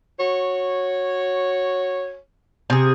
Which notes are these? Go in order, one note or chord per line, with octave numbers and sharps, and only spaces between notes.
F#4 C#5
C3 G#4